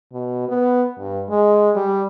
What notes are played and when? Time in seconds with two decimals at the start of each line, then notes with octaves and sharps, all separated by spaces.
0.12 B2
0.49 B3
0.99 G2
1.30 G#3
1.76 G3